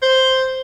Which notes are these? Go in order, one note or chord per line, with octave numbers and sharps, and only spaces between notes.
C5